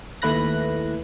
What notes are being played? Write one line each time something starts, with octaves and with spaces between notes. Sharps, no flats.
D#2 A3 E4 B4 F#6 A#6